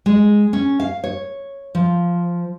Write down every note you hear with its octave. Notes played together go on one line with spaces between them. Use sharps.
G#3
C#4
F5
C#5
F3